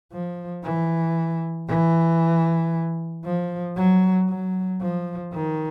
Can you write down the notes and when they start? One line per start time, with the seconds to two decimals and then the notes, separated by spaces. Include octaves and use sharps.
0.13 F3
0.64 E3
1.68 E3
3.25 F3
3.76 F#3
4.29 F#3
4.81 F3
5.33 D#3